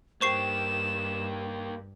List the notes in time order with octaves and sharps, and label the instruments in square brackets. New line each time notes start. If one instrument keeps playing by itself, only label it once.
[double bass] G2 [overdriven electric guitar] A#3 G4 [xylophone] C5 C#6 C7 [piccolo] E7